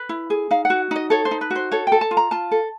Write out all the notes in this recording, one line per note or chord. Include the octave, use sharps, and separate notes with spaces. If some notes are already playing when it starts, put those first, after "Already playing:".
Already playing: B4
E4
G#4
D#4 F5
F#5
F#4
D#4 D#5
A4 C#5
C5
D#4
B4
F#4 C5
A4 C#5
A4 G5
A5
F4
A#5
F4 A5
A4